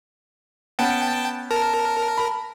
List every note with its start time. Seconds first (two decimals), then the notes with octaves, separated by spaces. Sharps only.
0.79 B3 C#4 B4 G5 A5
1.51 A#4 A5
2.18 B5